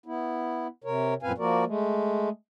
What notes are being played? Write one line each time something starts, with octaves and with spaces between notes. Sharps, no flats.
B3 E4
C3 A#4 C#5
F#2 A#2 C4 B4 F5 G#5
F3 A#3 F#4 A#4 D5
G#3 A3